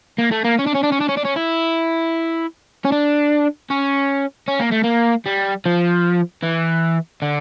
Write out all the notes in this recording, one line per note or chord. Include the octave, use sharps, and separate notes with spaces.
A#3
A3
A#3
C#4
D4
C#4
D4
C#4
D4
C#4
D4
C#4
E4
C#4
D4
C#4
C#4
A#3
A3
A#3
G3
F3
E3
D3